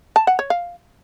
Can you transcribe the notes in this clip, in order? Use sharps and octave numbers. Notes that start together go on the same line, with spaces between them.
A5
F#5
C#5
F5